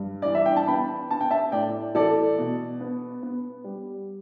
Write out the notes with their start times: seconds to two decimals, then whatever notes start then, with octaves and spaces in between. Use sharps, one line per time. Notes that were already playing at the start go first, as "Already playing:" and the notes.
Already playing: G2
0.22 E3 D5
0.35 E5
0.46 G5
0.56 A5
0.67 B3 G5 B5
1.11 B3 A5
1.21 G5
1.30 E5 A5
1.52 A2 D5 G5
1.94 E3 A4 D5
2.38 B2
2.80 B3
3.23 B3
3.64 G3